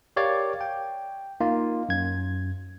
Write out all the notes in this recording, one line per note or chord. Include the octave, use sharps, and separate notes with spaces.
G4 A#4 C#5 D5 F5 D6
G5
A#3 D#4 F4
F#2 G#6